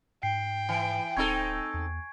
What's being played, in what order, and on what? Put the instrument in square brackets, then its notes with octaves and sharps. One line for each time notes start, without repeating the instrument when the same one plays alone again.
[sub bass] G#2 [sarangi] G5 [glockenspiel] C7
[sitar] E3 [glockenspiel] G#5 D7
[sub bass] D1 [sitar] C4 D#4 A4 [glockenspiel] C#6 G#6
[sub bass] E2